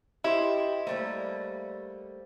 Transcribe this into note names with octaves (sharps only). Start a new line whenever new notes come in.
E4 G4 C5 D#5
G3 A3 A#3 C5